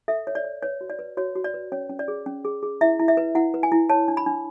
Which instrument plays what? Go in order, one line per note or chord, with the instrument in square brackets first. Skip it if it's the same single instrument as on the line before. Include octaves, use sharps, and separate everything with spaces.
[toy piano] A4 E5
C#5
D5
C#5
B4 C#5
F#4
D5
B4
F#4 C#5
F#4
D5
B4
C#4 C#5
C#4
D5
G#4
C#4
G#4
G#4
E4 E5
E4
E5
B4
E4 F#5
B4
G#5
E4
C#5 A5
D4
B5
D4